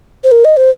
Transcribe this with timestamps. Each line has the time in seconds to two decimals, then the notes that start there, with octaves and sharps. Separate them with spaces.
0.24 C5
0.32 A#4
0.45 D#5
0.57 C5